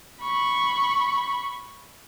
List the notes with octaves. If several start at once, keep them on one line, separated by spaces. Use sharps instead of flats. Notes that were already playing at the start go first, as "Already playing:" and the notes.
B5 C#6